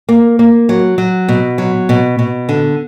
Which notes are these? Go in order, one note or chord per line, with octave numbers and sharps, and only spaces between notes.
A#3
A#3
F#3
F#3
B2
F#3
B2
B2
D3